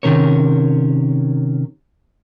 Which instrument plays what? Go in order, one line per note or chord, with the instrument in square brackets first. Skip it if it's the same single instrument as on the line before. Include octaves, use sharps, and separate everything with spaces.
[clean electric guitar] C3 D#3 C#4 A#4 C#5